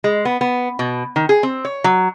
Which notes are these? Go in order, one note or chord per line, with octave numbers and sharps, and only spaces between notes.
G#3
B3
B3
B2
D#3
G#4
C4
C#5
F#3